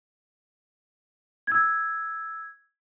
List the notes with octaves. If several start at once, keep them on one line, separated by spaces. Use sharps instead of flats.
E6 G#6